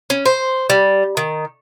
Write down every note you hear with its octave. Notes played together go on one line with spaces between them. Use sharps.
C#4
C5
G3
D#3